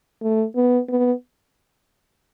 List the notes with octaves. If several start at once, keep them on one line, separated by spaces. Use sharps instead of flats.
A3
B3
B3